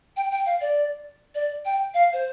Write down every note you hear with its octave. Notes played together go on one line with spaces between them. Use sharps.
G5
G5
F5
D5
D5
G5
F5
C5